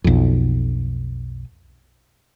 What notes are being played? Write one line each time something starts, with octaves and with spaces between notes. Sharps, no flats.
B1 F2